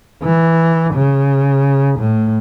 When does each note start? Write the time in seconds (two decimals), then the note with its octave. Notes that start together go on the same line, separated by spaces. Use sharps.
0.23 E3
0.94 C#3
1.99 A2